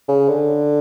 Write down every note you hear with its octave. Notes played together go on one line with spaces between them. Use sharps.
C#3
D3